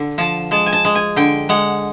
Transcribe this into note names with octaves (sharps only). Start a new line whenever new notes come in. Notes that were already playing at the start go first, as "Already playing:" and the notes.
Already playing: D3
F3 A5
G#3 A5
G#5
A5
G#3
G#5
D3 G5
G#3 F#5